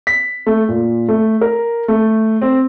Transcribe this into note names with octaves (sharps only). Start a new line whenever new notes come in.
B6
A3
A#2
A3
A#4
A3
C4